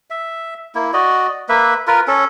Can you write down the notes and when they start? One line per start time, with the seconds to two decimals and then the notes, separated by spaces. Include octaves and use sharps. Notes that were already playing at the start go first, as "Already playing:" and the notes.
0.10 E5
0.75 A#3 E4
0.93 F#4 D5 D#5
1.49 A#3 B4 E5
1.87 F4 A#4 B4
2.08 C#4 A4